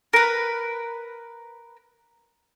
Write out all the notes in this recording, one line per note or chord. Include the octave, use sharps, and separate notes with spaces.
A#4 B4